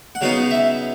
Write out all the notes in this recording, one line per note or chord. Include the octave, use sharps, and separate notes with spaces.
F#5
C#3 F#3 B3 D#4 F5
E5